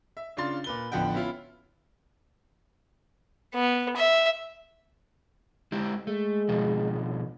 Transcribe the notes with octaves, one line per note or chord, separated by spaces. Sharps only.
E5
C#3 D4 F4 C6 A6
A#2 B4 G7
A1 D3 F3 B3 F#5 G5
B3 C#4 E4 F4
B3
E5
G#3 E4 G4
G#3 A3
B2 D#3 F3